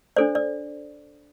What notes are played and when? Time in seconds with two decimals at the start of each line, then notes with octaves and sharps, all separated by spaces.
0.16 D4 A4 C5 D5
0.35 D5